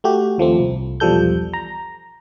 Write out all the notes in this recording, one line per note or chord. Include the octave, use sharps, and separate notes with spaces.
A3 F#4 G4
D#2 F3 A3 C4
C2
B1 E2 F3 G3 A4 G6
A#5